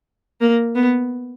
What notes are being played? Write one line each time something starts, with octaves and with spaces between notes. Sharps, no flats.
A#3
B3